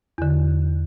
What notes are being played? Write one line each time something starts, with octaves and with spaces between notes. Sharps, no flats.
E2 D3